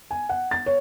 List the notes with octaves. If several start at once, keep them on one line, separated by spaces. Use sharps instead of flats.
G#5
F#5
A6
C#5